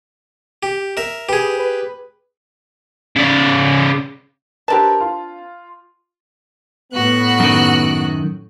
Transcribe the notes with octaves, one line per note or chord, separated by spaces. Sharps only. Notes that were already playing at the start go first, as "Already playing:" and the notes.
G4
A#4 E5
G4 G#4 B4
B4
C#3 D5
C4 D4 G4 A#4 B4 A5
F4
A2 B3 F#4 F#6
F#2 D#3